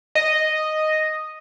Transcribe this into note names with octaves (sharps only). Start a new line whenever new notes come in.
D#5